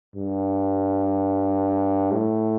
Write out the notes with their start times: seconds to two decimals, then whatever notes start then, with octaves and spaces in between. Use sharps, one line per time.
0.15 G2
2.12 A2